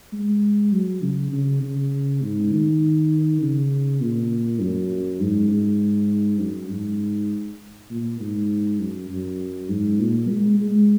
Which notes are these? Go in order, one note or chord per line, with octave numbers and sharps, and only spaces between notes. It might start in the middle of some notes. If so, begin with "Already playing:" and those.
G#3
F#3
C#3
C#3
C#3
G#2
D#3
C#3
A#2
F#2
G#2
G#2
F#2
G#2
A#2
G#2
F#2
F#2
G#2
A#2
G#3
G#3